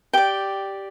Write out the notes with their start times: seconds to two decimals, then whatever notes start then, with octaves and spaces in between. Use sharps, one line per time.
0.13 G4 D5 G5